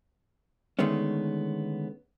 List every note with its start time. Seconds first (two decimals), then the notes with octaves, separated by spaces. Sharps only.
0.79 D3 D#3 G#3 A3 B3 C#4